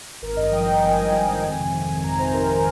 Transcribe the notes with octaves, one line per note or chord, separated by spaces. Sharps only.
G#1 A#4
G2 D#5
F3 G5
G#1 G5
G#1 G#5
G2
F3
G#1
F2
C3
D#3
F2
F2 A#5
C3 C5
D#3 A#4
A#4